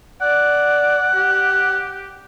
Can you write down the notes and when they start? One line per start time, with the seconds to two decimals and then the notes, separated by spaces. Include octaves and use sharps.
0.22 D5 F#5
1.15 G4